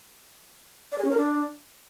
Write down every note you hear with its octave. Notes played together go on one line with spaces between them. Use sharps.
D5
G#4
C#4
A#4
D4